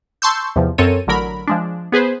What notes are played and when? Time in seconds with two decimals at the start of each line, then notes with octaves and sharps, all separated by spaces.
0.22 A5 C6 C#6 E6 G6
0.56 E2 C3 F3
0.78 F#2 C4 A4 A#4 C#5 D#7
1.07 A1 D3 F#3 A#4 B5
1.47 F3 G#3 D4
1.92 B3 G#4 B4 C5